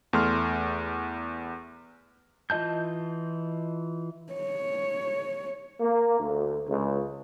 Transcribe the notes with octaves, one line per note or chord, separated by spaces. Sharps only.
E2 A3 C6 F6
E3 F4 D#5 A5 G6
C#5
A#3
D2
C#2